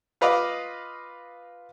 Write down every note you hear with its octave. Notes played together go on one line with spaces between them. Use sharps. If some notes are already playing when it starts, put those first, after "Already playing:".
F4 B4 D#5 F5 D6